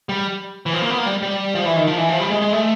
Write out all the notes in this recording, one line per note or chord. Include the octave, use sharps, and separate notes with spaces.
G3
E3
F3
A#3
B3
A#3
G3
G3
F3
E3
D#3
F3
E3
F3
G3
G#3
G#3
A3